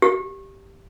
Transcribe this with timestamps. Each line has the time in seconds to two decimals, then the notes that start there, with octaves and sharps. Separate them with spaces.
0.02 G4